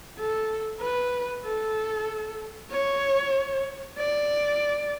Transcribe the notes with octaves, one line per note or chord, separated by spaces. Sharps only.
A4
B4
A4
C#5
D5